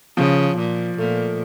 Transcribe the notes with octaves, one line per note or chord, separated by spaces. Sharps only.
C#3 F3
A#2
A#2 A3